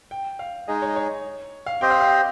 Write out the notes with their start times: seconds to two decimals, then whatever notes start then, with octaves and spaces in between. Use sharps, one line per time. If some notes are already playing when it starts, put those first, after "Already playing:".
0.11 G5
0.39 F5
0.68 G#3 D#4 G#4 D#5
0.82 C#5
0.96 C#5
1.66 F5
1.81 C4 G4 C5 D#5 G5
1.90 F5
2.01 F5